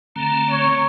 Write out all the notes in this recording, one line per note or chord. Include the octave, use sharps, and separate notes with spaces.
D3 A3 C4 A#5
C#5